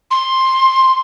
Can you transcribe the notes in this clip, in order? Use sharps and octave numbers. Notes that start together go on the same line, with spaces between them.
C6